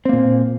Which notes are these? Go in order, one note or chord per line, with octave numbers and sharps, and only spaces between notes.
A#2 A#3 C4